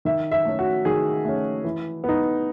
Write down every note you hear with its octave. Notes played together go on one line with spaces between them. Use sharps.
D#3 E5
E5
A3 C#4
F#4
D#3 G#4
A3 C#4
E3
B3 D#4